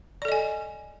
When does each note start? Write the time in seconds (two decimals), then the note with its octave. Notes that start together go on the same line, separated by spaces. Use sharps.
0.22 D5
0.25 A4
0.28 D#5
0.32 G#5